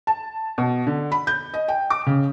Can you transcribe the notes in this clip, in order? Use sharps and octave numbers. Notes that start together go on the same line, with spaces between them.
A5
B2
D3
B5
G6
D#5
G5
D6
C#3